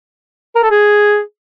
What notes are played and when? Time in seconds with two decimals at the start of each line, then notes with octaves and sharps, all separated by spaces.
0.56 A#4
0.63 A4
0.71 G#4